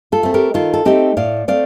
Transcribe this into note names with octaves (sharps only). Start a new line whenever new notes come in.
F4 A4
A3 C4
G4 A#4
D#3 F4 A4
A4
A3 C4 D#4 G4
A2 D5 F5
A3 C4 D5 F5